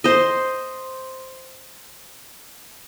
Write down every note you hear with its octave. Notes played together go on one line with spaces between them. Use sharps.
C5 D#5